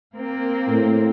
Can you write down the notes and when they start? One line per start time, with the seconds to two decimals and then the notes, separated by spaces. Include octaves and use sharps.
0.15 A#3 C4
0.67 A2